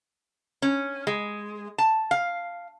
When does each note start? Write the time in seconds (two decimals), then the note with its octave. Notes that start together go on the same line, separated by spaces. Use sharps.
0.62 C#4
1.07 G#3
1.78 A5
2.11 F5